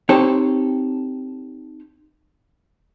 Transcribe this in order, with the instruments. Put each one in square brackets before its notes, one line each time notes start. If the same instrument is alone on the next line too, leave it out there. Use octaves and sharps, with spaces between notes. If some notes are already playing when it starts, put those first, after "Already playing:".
[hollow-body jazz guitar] C4 D#4 G4 A4 C5 C#5